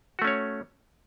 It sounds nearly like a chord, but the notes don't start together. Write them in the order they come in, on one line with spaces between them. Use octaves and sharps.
F#4 A3 C#4 C#5